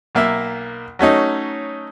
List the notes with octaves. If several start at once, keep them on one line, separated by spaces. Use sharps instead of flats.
B1 A#3 E5
F#3 A3 C#4 D#4